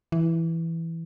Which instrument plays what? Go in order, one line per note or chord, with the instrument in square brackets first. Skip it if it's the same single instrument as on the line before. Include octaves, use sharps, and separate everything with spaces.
[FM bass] E3